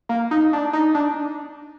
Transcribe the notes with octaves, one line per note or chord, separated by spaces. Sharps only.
A#3
D#4
D4
D#4
D4